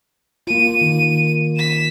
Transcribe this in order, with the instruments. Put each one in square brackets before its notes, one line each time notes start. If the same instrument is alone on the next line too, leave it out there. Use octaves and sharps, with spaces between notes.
[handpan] A#3 F4 [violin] D#7
[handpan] D#3
[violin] B6 E7